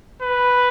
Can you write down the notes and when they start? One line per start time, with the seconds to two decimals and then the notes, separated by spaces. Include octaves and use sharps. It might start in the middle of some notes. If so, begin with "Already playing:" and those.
0.22 B4